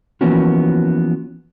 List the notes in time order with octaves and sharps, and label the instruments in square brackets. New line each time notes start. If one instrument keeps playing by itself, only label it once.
[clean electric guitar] E3 F3 A#3 B3 C#4 F#4